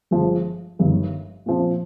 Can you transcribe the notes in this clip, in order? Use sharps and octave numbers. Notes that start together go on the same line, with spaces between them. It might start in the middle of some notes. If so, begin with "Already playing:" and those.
G1 G2 F3 G#3
G1 G2 D#3
A#2 F3 C4